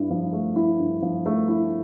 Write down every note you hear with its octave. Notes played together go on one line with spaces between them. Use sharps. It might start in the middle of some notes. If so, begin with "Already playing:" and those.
Already playing: G2 E4
F3
A3
E4
G2
F3
A3
E4